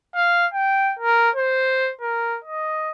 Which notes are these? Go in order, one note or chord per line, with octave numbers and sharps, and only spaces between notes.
F5
G5
A#4
C5
A#4
D#5